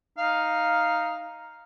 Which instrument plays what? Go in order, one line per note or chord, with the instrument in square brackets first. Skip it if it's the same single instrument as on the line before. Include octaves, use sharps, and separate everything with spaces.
[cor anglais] D#4 [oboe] F5